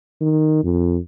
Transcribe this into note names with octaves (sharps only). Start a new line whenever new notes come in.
D#3
F2